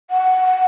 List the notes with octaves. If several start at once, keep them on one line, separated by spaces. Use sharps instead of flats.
F#5